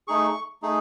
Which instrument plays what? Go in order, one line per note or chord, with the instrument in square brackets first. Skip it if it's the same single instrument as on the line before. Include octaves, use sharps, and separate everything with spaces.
[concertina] A3 D#4 G#4 C#6
A3 D#4 G#4